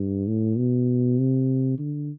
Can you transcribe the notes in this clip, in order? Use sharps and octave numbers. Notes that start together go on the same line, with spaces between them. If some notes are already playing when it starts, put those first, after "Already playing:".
Already playing: G2
A2
B2
C3
D3